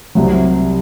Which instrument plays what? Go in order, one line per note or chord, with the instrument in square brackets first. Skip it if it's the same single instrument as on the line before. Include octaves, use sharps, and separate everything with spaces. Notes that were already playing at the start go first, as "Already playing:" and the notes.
[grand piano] C2 C3 F#3